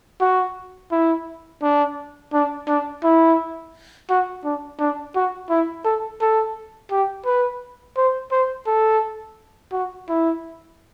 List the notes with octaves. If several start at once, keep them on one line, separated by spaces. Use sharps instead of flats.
F#4
E4
D4
D4
D4
E4
F#4
D4
D4
F#4
E4
A4
A4
G4
B4
C5
C5
A4
F#4
E4